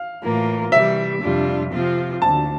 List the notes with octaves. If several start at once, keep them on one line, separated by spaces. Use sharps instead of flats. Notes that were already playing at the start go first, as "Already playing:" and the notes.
Already playing: F5
A2 E3 A#3 F4
C3 E3 G3 E5
F2 C3 G3 D4 F4
C3 F3 C4 F4
D2 D3 A3 A5